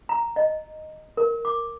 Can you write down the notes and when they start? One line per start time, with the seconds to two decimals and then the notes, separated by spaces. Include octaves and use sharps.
0.09 A#5
0.36 D#5
1.17 A#4
1.45 D6